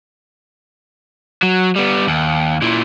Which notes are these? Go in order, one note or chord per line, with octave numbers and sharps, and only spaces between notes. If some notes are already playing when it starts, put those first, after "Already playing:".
F#3
G3 B3
D#2
A#2 E3